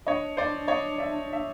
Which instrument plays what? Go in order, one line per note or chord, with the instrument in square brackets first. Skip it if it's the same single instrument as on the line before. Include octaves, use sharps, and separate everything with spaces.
[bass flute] D4 [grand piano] C#5 D#5
[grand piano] C5 D5
C#5 D#5
D5 E5
E5